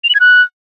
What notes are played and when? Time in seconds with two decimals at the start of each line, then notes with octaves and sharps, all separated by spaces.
0.04 F7
0.09 F#7
0.15 G#6
0.20 F#6